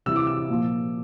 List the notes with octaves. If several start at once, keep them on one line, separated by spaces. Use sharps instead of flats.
C3 E3 G3 E6
D6
E6
A#2 F3